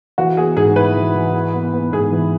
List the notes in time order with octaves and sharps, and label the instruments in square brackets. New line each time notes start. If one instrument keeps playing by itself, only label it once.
[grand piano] E3 [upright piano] F#4
[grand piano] B3 [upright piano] G#4
[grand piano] G#2 [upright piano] G#4
[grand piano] E4 [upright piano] B4
[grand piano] E3
E3
E4
B3
B3
[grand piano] G#2 [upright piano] G#4
[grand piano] E3